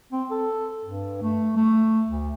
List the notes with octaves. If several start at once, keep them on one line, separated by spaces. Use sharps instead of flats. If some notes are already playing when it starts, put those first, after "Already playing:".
C4
A4
G2
A3
A3
D2